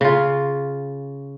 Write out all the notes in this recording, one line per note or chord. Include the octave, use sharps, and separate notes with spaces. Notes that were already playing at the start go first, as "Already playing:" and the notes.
C#3 F4